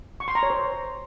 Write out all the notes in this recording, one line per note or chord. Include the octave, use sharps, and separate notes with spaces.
C#6
C6
A#5
C#5
C5